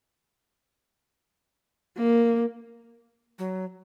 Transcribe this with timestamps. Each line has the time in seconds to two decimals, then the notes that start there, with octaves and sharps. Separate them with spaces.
1.97 A#3
3.39 F#3